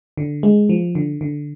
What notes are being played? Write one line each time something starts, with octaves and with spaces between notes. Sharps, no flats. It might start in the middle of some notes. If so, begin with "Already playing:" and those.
D3
G#3
F3
D3
D3